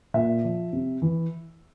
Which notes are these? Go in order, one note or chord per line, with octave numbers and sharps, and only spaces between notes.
A#2 E5
F3
C3
E3